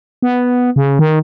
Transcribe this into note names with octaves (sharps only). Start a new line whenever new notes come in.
B3
C#3
D#3